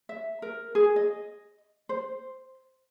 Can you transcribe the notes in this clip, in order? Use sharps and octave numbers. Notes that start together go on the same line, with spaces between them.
E5
A#4
G#4
D#5
C5